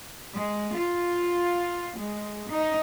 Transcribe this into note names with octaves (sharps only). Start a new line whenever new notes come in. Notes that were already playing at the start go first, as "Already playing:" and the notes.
G#3
F4
G#3
D#4